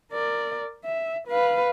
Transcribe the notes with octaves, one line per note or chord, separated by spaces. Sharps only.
A#4 D5
E5
B4 F5